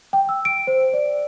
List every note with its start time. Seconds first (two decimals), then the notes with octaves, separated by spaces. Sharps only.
0.13 G5
0.29 E6
0.45 D7
0.67 C5
0.93 D5